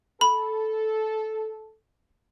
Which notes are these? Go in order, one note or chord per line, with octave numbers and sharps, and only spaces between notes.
A4 B5